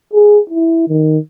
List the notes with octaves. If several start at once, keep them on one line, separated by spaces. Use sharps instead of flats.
G#4
E4
D#3